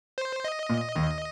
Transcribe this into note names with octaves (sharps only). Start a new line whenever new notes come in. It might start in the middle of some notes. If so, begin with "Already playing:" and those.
C5
D#5
A#2
D#2 D#3